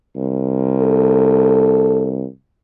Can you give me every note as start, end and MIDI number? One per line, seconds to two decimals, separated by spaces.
0.16 2.25 36
0.79 2.14 69